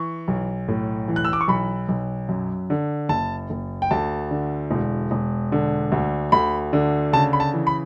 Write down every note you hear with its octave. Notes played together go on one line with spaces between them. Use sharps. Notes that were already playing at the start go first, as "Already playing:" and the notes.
Already playing: E3 C#6
B1
A2
E3
F#6
E6
D6
C#6
B1 B5
B1
F#2
D3
F#1 A5
F#1
G5
D2 A5
D3
E1
E1
D3
D2
D2 B5
D3
C#3 A5
B5
A5
E3
B5